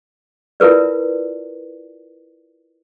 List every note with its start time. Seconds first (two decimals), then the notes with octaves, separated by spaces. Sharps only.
0.60 E4 F4 A#4 B4 D5